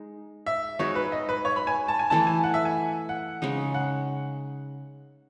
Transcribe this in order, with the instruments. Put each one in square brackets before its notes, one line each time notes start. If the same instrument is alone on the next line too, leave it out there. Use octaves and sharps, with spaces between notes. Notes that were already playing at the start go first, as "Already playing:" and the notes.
Already playing: [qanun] G#3 D#4 G#4
[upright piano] E5
[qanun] G#3 D#4 F#4 [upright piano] C#5
[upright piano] B4
D#5
B4
C#5
B5
G#5
A5
G#5
[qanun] E3 A3 E4 [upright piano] A5
[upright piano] G#5
F#5
E5
G#5
F#5
[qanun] C#3 G#3 D#4
[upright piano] F#5